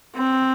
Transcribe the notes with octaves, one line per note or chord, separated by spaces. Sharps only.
C4